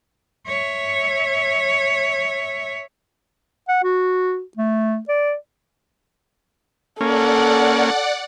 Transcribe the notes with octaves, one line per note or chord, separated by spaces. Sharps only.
C#5 E5
F#5
F#4
A3
D5
A#3 C#4 A4 D5 F#5